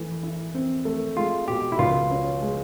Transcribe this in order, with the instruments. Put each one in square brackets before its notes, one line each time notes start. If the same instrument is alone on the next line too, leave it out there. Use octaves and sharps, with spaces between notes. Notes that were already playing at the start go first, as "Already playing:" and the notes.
Already playing: [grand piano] E3 A3
E4
C4
A3
[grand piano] G#3 [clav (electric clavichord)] F4
[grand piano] B2 [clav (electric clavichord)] G4
[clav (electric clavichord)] E4
[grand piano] C#2 [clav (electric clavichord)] F4
[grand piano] C#4
G#3